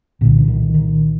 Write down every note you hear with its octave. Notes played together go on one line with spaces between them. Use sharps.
C2 A#2 D3
E3
D#3
D#3